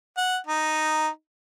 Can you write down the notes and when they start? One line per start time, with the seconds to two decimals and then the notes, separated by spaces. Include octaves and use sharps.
0.17 F#5
0.47 D#4